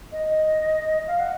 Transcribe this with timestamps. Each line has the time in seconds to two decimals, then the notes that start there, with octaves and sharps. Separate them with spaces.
0.12 D#5
1.07 F5
1.19 F#5